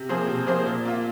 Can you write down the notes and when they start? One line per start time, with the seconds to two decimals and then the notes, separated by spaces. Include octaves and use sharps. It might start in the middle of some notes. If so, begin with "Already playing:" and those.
Already playing: C3
0.09 F3 A#3 G#4 C5
0.28 C3
0.47 F3 A#3 G#4 C5
0.66 A#2
0.85 A#3 F4